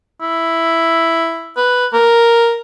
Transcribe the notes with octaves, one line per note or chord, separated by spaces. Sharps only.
E4
B4
A#4